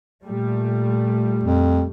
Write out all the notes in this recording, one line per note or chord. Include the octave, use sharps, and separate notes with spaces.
A#2 G3 A3
F2